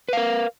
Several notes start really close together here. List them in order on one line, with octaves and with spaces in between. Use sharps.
B4 F5 A#4